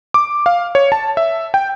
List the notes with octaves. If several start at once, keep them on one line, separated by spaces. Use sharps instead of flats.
D6
F5
C#5
A5
E5
G5